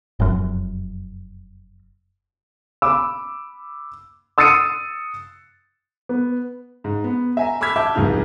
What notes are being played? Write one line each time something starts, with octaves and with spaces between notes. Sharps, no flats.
F1 F#2
B5 D6 E6
D#6 E6 A6 C7 C#7 D#7
B3
G#2
B3
E5 G#5 A#5
B5 D6 E6 F6 G#6 B6
E5 A5 D6 E6 G6
F1 C2 G#2 C#3 D#4 F6